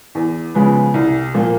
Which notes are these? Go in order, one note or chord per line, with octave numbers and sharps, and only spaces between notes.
E2
C#3 F3 G#3 B3
C2
A#2 F3 A#3